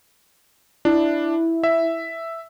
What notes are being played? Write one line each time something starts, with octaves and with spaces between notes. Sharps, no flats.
D4 E4
E5